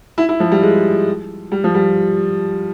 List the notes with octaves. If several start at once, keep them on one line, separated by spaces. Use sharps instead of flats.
E4
E4
F3
G3
G#3
G3
F3
G3